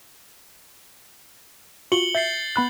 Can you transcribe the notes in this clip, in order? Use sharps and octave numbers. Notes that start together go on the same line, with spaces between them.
F4 F#4 C#7 F#7 G7
E5 G6 A6 C7
B3 B5 F#6